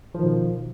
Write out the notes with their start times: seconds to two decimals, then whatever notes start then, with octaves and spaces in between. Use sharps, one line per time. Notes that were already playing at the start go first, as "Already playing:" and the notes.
0.15 F3
0.19 D#3
0.23 B2